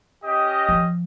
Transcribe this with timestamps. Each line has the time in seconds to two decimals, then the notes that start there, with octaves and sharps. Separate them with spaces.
0.23 C#4 G4 D#5
0.69 F3